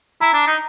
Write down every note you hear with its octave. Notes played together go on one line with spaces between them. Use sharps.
E4 A#5
D4
D#4